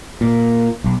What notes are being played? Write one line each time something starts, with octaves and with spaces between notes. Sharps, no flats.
A#2
B1